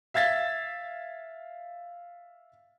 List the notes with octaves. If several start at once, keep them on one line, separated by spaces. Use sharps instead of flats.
E5 F5 G#6 A6 B6